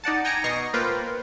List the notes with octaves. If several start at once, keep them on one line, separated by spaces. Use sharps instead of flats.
D#4 D5 F#5 A5
G5 G#5 A#5 A#6 C#7 D7
B2 D#5 A#5 C#6 A#6 C7
A#3 F4 B4 C5 G5